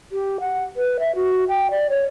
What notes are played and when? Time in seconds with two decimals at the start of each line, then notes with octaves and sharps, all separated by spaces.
0.12 G4
0.40 F#5
0.76 B4
0.99 E5
1.15 F#4
1.49 G5
1.71 D5
1.89 C#5